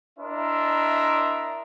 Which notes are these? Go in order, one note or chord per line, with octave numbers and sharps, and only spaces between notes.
D4 E4 A#4 D#5 E5 C6